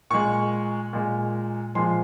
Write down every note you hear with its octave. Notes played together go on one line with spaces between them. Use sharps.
A#2 G#3 C#6
A#2 G#3
A#2 F3 G#3 C6